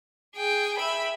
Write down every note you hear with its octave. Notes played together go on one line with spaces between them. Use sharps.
G#4 G5
E5 B5